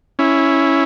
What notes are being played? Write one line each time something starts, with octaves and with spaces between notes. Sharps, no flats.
C#4 E4